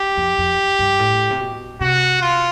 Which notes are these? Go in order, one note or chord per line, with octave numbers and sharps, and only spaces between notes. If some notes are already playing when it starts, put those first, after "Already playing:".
Already playing: G4
F2
F2
G2
A2
C3
B2
C3 F#4
F4